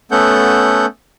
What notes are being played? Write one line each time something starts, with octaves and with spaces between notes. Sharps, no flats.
A3 B3 C#4 A4 F#5 G6